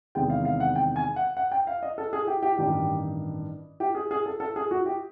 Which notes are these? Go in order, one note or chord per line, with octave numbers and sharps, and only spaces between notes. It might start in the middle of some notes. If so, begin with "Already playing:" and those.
E2 C3 D#3 G#3 G5
F5
F5
F#5
G5
G#5
F#5
F#5
G5
F5
D#5
A4
G#4
G4
G4
A1 G2 D#3 G4
G4
G#4
G#4
A4
A4
G#4
F#4
G4